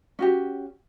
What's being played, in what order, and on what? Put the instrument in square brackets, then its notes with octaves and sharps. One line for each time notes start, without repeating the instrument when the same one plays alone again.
[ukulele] C#4 F#4 G4